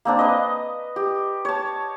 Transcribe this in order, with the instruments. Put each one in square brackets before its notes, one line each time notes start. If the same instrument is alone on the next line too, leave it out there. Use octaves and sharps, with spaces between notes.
[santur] A#3 C4 D4
B4 D#5
G4
C#5 A5